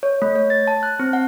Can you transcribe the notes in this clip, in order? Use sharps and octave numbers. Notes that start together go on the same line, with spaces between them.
C#5
A3
C#5
A6
A5
F#6
C4
F#5